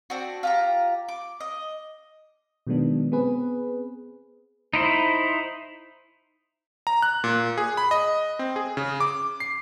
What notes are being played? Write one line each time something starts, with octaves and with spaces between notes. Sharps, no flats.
C4 D4 F#4
F4 G4 A#5
D6
D#5
B2 D#3 F#3 G#3 B3 D4
B3 C4 G#4 B4
D#4 E4 C5
A#5
F#6
A#2
G#4
B5
D#5
C4
G#4
C#3
D6
C7